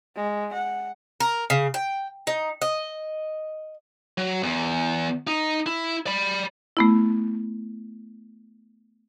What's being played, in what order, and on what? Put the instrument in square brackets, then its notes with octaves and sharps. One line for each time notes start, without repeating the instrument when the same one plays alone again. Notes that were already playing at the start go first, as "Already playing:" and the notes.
[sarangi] G#3
F#5
[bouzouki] A#4
C#3
G5
D#4
D#5
[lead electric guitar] F#3
E2
D#4
E4
D5 B5
[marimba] A3 B3 E4